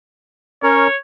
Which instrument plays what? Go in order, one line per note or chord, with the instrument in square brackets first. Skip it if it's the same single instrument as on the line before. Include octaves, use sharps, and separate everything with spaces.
[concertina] C#4 A#4 [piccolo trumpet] C#5